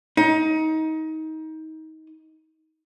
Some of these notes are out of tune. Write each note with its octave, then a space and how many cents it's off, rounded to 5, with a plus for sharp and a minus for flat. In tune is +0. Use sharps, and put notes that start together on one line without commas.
D#4 +25